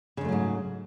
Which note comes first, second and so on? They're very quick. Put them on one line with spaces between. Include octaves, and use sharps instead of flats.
C#3 F2 A3 F#3 G#2